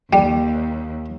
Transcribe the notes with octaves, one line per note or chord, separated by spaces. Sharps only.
D#2 G3